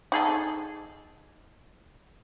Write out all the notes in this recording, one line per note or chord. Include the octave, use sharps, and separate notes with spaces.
D#4 G#4 A4